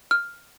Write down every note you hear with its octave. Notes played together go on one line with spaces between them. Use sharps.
F6